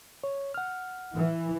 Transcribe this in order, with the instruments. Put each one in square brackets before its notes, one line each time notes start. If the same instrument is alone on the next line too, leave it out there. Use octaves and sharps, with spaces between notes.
[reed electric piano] C#5
F#5 F6
[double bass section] E3